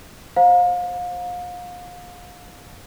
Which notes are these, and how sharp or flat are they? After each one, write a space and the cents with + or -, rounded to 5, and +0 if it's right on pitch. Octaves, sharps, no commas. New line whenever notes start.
C5 +15 F5 +35 A#5 +15